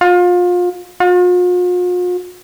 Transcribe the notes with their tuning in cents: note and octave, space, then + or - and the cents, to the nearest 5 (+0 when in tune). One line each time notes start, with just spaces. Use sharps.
F4 +30
F4 +45